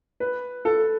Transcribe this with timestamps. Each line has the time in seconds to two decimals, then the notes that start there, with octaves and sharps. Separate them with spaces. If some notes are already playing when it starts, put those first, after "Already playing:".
0.20 B4
0.65 A4